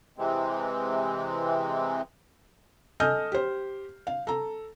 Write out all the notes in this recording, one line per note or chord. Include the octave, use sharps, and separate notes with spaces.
C3 E3 G#3 C4
A4 D#5 G#5 D#6 F6 G6
G4 C5
F5
A4 A#5